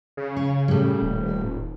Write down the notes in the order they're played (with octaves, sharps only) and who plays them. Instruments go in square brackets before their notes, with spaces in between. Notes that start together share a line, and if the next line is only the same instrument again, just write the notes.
[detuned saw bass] C#3
[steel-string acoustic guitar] C#5
A2 G3
[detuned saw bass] D#1